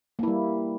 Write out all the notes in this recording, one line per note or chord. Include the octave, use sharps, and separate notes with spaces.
G3 A#3 E4